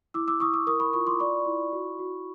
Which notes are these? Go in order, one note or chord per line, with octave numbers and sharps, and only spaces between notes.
E4 D6 E6
D6 E6
E4 C#6 D#6
D6 E6
A#4 C#6 D#6
B5 C#6
F4 B5 C#6
C6 D6
D5 B5 C#6
E4
F#4
F#4